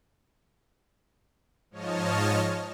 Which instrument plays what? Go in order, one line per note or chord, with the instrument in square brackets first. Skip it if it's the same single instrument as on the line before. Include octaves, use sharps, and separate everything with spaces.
[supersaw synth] G#2 F3 C#5 D#5 A5 F6